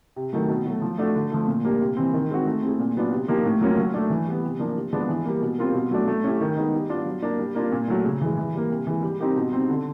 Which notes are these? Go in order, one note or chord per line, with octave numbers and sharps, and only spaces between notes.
C3
D#3 F#3 A3
B2
F#3 A3
F3
A3 D4 F#4 A4
D3
F3 A3
A#2
G3 A#3 D4 G4
C3
E3 G3 C4
D#3
G#3 C4 D#4 F#4
A3
C4 E4 G#4
A#2
F#3 B3 D4 F4
C3
F3 A#3 D#4 G4
A2
F#3 A#3 C#4 F4
F#3
A3 D4
E3
G3 B3
C3
F3 A#3 D4
C3
F3 G#3 B3 D4
E3
G3 A#3
B2
G3 C4 F4 A#4
B2
F#3 A3 D4
A3
C#4 E4 G4
D#3
G#3 B3 D#4
G3
B3 D4 F4
F#3
A#3 D4
G3
A#3 D4 F4
A#2
F#3 A3
C#3
E3 G#3
E3
G3 A#3
C3
E3 G#3
G3
C4 D#4 G4 A#4
B2
G3 C4 D#4
D3